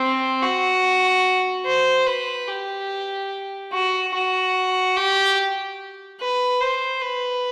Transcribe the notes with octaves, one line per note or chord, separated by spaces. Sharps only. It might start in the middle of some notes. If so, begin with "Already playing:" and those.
Already playing: C4
F#4
C5
B4
G4
F#4
F#4
G4
B4
C5
B4